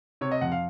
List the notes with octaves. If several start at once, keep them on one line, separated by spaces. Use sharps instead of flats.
C3 C#5
D#5
F2 F#5
F5